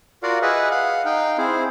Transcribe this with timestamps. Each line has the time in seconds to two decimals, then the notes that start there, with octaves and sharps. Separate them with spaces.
0.23 F4 F#4 A#4 D5 F5 F#5
0.42 G#4 B4 D#5 E5 F#5
0.71 F5 F#5
1.05 D#4 F5 G5
1.38 C4 E4 G#4 C5